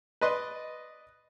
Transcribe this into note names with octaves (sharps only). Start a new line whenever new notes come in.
B4 D5 D#5 C6